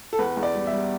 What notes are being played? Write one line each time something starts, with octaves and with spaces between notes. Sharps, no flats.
A4
E2 B4
E2
D5
G3
E5
G3